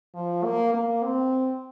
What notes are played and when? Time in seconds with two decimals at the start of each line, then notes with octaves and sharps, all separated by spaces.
0.14 F3
0.44 A#3
0.73 A#3
1.03 C4